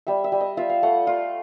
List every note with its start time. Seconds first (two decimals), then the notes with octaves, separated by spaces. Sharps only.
0.07 G3 E5
0.24 E5
0.32 G3
0.41 D#5
0.57 F4 E5
0.69 F5
0.83 A3 F#5
1.07 F4